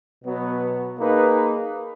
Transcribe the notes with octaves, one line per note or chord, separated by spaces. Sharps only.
B2 F#3 B3
A#3 D#4 G#4 B4